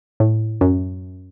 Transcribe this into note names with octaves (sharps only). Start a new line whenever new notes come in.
A2
F#2